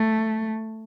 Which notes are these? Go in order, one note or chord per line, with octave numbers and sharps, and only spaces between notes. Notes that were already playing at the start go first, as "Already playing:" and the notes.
Already playing: A3